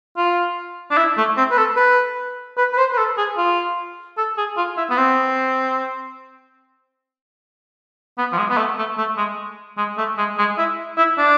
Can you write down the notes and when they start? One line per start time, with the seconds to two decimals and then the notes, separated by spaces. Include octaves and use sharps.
0.17 F4
0.91 D4
0.97 E4
1.17 A3
1.37 C4
1.51 B4
1.58 A4
1.76 B4
2.58 B4
2.73 B4
2.78 C5
2.92 B4
2.97 A4
3.18 G#4
3.37 F4
4.17 A4
4.37 G#4
4.57 F4
4.77 E4
4.90 B3
4.97 C4
8.18 B3
8.32 F3
8.38 G#3
8.50 B3
8.57 A3
8.78 A3
8.98 A3
9.17 G#3
9.77 G#3
9.97 A3
10.17 G#3
10.38 G#3
10.58 E4
10.97 E4
11.18 D4